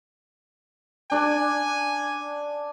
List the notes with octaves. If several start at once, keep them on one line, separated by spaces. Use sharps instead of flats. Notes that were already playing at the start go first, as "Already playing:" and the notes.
D4 D5 G#5